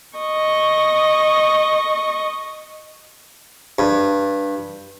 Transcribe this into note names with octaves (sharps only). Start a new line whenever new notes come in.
D#5 C#6
G2